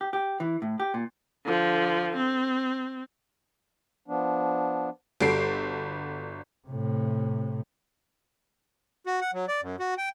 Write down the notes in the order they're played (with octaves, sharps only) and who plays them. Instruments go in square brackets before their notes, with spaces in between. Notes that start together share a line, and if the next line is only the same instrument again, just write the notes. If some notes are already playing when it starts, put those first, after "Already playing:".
[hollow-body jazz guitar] G4
G4
E3
A2
G4
A#2
[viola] D3 F3
C4
[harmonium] F3 B3 D4
[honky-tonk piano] G1 G3 F#4 A4 C7 D7
[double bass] A2 C3
[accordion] F#4
F#5
F#3
D5
F#2
F#4
G5